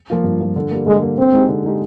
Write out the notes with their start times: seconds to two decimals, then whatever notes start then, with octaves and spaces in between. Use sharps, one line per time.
0.10 F3 A#3 F4
0.24 G2
0.40 F3 A#3 F4
0.56 D3
0.71 G3 A#3
0.87 D3 G#3
1.02 G3 A#3
1.18 D3 C4
1.33 G#3 D#4 G4
1.49 D3
1.65 G#3 D#4 G4